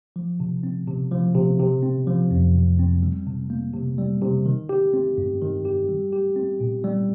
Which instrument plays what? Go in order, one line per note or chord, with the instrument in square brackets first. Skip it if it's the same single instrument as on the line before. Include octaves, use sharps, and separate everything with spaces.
[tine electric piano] F3
C3
C4
C3
F3
C3
C3
C4
F3
F2
C3
C4
G3
C3
A#3
C3
G3
C3
D#3
G4
C4
G2
D#3
G4
G3
G4
C4
A#2
G3